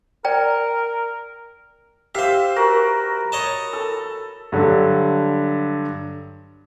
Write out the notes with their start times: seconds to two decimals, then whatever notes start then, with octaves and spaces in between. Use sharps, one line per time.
0.25 A#4 D5 G5 A#5
2.15 G4 C5 E5 F5
2.56 F#4 A#4 B4
3.32 C#5 D#5 A5
3.73 A4
4.52 G2 D3 F#3